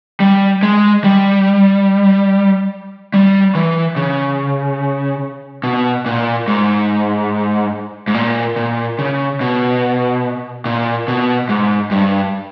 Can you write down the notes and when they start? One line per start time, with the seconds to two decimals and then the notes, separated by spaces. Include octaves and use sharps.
0.20 G3
0.63 G#3
1.04 G3
3.14 G3
3.55 E3
3.96 C#3
5.64 B2
6.06 A#2
6.48 G#2
8.08 G#2
8.14 A#2
8.56 A#2
8.99 C#3
9.41 B2
10.65 A#2
11.08 B2
11.49 G#2
11.91 G2